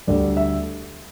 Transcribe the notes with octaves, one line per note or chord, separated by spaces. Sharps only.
D2 D3 G3 D5
E5